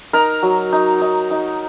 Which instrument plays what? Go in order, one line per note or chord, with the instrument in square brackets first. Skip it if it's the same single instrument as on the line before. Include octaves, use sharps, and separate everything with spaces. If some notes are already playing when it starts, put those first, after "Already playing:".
[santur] D#4 A#4 A#5
F#3
D#4
D#4
D#4